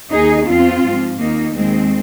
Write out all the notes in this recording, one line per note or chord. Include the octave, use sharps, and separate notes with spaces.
D#2 D#3 D#4 G#4
F2 F3 C4 F4
G#2 F3
D#2 D#3 A#3 D#4
D#2 D#3 G#3 C4